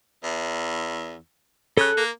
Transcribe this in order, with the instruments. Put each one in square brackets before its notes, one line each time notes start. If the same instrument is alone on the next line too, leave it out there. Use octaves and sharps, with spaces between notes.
[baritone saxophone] E2
[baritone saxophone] C#3 [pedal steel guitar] A4 F#6
[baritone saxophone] A#3